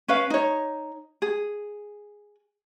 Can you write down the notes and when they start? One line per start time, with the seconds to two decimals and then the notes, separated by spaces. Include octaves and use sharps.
0.08 C#4 B4 F5
0.30 D#4 C#5
1.22 G#4